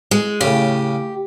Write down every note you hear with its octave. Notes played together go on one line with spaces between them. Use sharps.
G#3
A2 C#3 G4